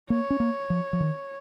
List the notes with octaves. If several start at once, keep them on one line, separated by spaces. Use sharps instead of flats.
A#3 C#5
C#4
A#3
F3
F3
D#3